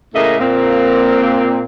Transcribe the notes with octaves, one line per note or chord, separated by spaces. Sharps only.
A2 C#3 A#3 A4 D#5 E5
A#2 A#3 C4